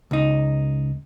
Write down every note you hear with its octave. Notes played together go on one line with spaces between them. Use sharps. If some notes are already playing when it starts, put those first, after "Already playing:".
C#2 D#4